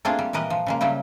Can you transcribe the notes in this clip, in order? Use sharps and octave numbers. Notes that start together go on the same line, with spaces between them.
A3 A#3 C4 D4 F4 G#4
G3
A#2 E3 A#4 B4 D#5
F3
C#3 G#3 A#3
C#3 F#3 G3 E4 G5